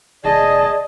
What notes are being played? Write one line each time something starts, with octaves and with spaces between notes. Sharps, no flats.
F1 G#4 D5 D#5 A5